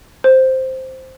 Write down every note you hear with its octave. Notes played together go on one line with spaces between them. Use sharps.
C5